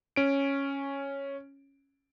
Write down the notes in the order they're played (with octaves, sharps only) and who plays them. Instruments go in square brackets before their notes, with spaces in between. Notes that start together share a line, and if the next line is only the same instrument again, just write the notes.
[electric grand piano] C#4 D7